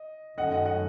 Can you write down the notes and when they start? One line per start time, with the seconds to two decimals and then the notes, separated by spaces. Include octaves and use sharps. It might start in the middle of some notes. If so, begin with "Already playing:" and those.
Already playing: D#5
0.37 F#2 D#3 A3 C#4 D#5 F#5
0.52 D#5 F#5
0.65 D#5 F#5